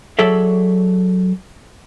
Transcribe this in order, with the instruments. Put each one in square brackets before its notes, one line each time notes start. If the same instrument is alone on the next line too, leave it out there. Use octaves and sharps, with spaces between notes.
[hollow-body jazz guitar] F#3 G#4 A4 C#5 D5 E5